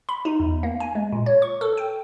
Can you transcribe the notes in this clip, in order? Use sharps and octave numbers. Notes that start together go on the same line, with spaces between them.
B5
D#4
E2
A#3
G#5
G#3
A#2
C#5
C#6
A4
G5